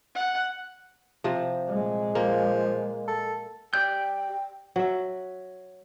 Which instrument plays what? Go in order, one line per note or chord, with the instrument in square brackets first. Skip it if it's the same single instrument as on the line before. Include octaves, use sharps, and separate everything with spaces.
[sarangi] F#5
[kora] C3 F3
[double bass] A#2 G#3
[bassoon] F3 [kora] A#3
[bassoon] A4
[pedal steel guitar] G4 D5 G6 [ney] G5
[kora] F#3 E5